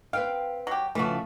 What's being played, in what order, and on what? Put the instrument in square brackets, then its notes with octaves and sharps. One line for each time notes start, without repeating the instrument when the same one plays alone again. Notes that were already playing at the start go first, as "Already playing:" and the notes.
[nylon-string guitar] C4 B4 G5 [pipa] F5
[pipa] F#3 G4
[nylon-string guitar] C#3 F3 A3 [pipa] E3 F#4